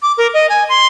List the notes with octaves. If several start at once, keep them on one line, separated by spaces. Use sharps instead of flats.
D6
A#4
D#5
G#5
C6